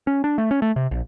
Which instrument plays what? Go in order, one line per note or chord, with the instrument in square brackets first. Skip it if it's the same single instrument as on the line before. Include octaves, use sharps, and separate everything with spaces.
[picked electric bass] C#4
D4
A3
C#4
A3
C3
A#1